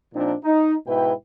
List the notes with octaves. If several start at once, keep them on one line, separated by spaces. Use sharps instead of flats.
A#2 F3 C4 D4 D#4
D#4
G#2 B2 E4 B4 G5